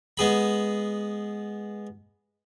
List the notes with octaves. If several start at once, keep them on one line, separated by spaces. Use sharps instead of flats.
G#3 B3 G#4 B5